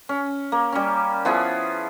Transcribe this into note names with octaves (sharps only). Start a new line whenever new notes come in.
C#4
A#3
G3 C#4
F3 B3 E4 G#4